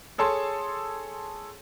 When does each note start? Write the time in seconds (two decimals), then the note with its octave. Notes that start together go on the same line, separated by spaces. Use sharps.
0.18 G#4 A4 C#5 A5 C6